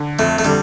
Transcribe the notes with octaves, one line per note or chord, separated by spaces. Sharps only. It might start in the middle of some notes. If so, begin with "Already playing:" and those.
Already playing: D3
F2 A3
A3
D3 G3